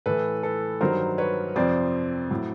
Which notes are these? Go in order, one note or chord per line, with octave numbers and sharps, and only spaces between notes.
A2 E3 A4 B4
A4 B4
G2 D#3 F#3 A#4 C5
B4 C#5
F2 C3 F3 C5 D5
A2 F#3